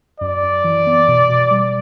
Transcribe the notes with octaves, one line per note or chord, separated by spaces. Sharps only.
F#2 D5
F#2
E3
B3
B2
B2
G3